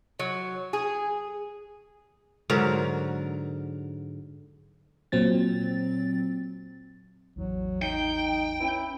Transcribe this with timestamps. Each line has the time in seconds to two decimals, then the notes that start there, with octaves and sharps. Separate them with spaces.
0.20 F#3
0.73 G#4
2.50 G#2 D3 F#3 A#4
5.12 A#2 F#3 C4 A6
7.36 A1 E2 F#3
7.82 D#4 G5
8.60 C#4 E4 B4